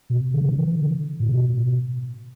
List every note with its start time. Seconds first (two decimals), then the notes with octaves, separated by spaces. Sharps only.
0.10 B2
0.34 D3
0.41 C#3
0.49 D3
0.58 E3
0.81 D3
1.20 A2
1.29 B2